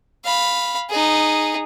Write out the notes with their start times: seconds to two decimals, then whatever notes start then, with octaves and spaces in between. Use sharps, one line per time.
0.25 F5 B5
0.90 D#4 G#4